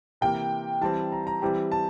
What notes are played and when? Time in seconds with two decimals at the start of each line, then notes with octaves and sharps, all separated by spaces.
0.21 C3 E3 A#3 G5
0.81 E3 G3 C4 A5
1.12 A#5
1.27 A#5
1.42 E3 G3 C4 G4
1.72 A5